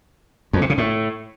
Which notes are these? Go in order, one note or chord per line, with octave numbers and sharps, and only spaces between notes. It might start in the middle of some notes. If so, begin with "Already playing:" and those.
F2
C3
C#3
A2